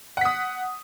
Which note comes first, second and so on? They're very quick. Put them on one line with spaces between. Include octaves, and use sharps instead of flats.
F#5 B6 D#6